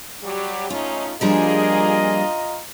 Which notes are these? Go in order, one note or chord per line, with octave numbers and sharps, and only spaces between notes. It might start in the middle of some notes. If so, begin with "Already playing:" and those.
F#3 G3 G4
A3 C#4 D#4 F4
F3 G3 A#3 D4 F4 G#4 D#5 A#5